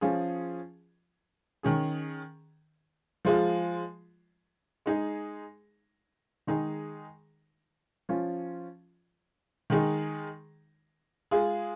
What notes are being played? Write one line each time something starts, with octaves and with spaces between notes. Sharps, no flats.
F3 C#4 F4 G#4
D#3 C#4 G#4
F3 G#3 F4
G#3 D#4 G#4
D#3 G#3 D#4 G#4
F3 C#4 F4
D#3 G#3 D#4 G#4
G#3 F4 G#4